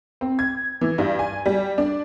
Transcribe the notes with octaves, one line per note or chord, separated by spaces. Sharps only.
C4
G#6
E3
G2
G#5
G3
D4